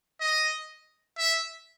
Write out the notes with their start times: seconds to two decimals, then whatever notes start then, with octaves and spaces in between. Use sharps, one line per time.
0.21 D#5
1.19 E5